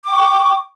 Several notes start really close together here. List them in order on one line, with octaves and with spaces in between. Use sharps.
D6 G5 C#6